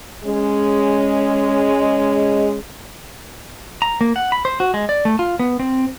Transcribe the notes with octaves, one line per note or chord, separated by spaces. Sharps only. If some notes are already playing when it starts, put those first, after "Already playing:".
G#3 C#4
A#5
A#3
F#5
B5
C5
F#4
G#3
D5
A3
F4
B3
C4